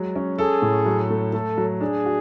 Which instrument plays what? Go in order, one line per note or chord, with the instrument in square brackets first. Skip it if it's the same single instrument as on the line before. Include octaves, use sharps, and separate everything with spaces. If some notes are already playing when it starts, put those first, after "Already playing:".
Already playing: [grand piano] F#3 G#3
C#4
[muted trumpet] G#4 [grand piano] A4
[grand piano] A2
F#3
A3
[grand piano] A3 [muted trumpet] A4
[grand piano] F#3
[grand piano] D4 [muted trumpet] G#4
[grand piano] F#4